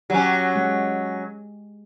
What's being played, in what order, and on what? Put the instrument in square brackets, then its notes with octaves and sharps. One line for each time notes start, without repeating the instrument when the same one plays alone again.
[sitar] F#3 C#4 [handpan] G4
[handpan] G#3